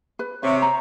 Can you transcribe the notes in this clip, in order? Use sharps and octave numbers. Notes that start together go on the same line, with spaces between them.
B4
C3 C#5 E5
A#5